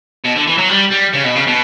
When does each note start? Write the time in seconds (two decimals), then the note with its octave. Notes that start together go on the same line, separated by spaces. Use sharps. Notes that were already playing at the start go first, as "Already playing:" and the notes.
0.25 B2
0.36 D3
0.47 E3
0.58 F#3
0.69 G3
0.91 G3
1.13 C#3
1.24 B2
1.36 C#3
1.47 B2